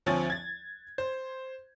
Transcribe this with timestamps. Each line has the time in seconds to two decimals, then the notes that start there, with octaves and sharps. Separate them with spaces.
0.06 D2 F3 C4 C#5 G#5 A6
0.30 G#6 A6
0.98 C5